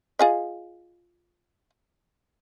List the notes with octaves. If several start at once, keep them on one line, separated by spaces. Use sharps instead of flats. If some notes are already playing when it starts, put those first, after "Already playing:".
F4 G#4 D#5